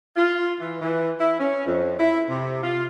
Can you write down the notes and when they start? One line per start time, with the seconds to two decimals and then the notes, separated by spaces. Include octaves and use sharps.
0.17 F4
0.60 E3
0.81 E3
1.20 E4
1.39 C#4
1.67 F2
2.00 E4
2.29 C3
2.63 F4